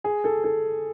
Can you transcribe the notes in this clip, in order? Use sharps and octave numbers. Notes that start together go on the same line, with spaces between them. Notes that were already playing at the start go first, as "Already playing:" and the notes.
G#4
A4
A4